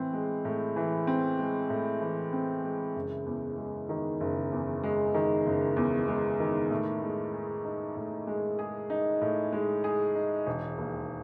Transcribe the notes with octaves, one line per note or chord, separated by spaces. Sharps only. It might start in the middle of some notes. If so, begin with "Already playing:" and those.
Already playing: A2 E3 C4
G#3
A2
E3
C4
G#3
A2
E3
C4
G#3
F#1
E2
G#3
D#3
F#1
E2
G#3
D#3
F#1
E2
G#3
D#3
A2
G#3
G#4
D#4
A2
G#3
G#4
D#4
A2
G#3
G#4
D#4
E1
D#2